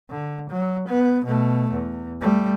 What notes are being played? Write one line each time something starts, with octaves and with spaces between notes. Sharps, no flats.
D3
F#3
B3
B2 A3
E2
G3 A3